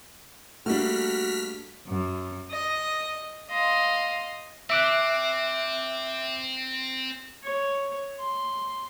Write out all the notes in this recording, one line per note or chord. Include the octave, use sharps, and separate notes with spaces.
G3 A3 A#3 D4 F#4 F6 B6
F#2
D#5
D#5 F5 C6
C4 E5 D6 F#6
C#5
C6